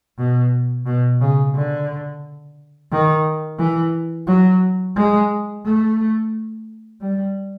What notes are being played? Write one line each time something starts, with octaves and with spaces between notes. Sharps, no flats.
B2
B2
C#3
D3
D#3
E3
F#3
G#3
A3
G3